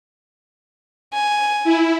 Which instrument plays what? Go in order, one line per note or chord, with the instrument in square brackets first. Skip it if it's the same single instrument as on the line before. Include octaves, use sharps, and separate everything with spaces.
[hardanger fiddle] G#5
[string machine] E4